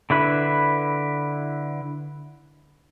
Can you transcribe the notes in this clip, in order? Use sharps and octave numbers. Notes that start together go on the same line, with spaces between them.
D3 E4 B4